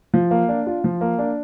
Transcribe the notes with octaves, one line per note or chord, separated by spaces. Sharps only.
F3
A#3
D4
F4
F3
A#3
D4